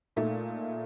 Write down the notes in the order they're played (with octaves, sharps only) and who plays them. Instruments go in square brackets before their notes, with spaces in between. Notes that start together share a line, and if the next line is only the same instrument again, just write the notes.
[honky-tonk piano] A#2 A3 D#4